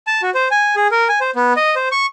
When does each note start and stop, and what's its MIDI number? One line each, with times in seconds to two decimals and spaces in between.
0.07 0.21 81
0.22 0.30 66
0.34 0.48 72
0.51 0.75 80
0.76 0.88 68
0.91 1.08 70
1.09 1.19 80
1.21 1.31 72
1.35 1.53 59
1.57 1.75 75
1.76 1.89 72
1.92 2.06 85